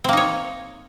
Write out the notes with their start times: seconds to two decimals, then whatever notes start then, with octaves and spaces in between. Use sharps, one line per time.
0.04 C4
0.09 A#3
0.13 D#4
0.17 C#5